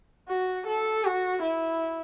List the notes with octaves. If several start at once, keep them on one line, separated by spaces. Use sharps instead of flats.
F#4
A4
F#4
E4